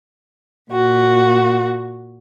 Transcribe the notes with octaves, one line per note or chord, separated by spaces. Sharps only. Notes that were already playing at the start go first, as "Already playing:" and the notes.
A#2 F#4